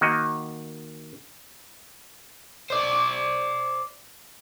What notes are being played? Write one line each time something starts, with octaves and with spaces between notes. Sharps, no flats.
D#3 A#3 F#4 D#5
C5 D5